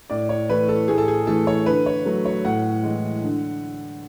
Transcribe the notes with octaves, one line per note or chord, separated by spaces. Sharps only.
A2 D5
C#5
E3 A3 B4
A4
A2 G#4
A4
G#4
E3 A3 A4
C#5
D3 B4
C#5
F#3 A3
C#5
A2 F#5
E3 G#3
D3